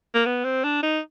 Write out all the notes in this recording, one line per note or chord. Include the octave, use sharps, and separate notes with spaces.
A#3
B3
C4
D4
D#4